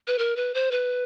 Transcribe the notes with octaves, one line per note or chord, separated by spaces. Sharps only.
B4
A#4
B4
C5
B4